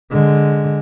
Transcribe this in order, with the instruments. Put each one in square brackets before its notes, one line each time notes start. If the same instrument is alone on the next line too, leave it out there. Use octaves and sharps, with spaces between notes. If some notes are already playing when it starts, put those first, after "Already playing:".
[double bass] D3 G#3